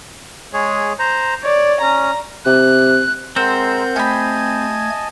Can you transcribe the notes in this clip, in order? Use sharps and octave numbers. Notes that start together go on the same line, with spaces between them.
G#3 G#4 C#5
C5 A#5
C#5 D5
C#4 A#5
C3 F#6
G#3 C4 A#4 C5 F#5 A#5 E6 G6
A3 G4 D#5 G#5 A5 B5 G#6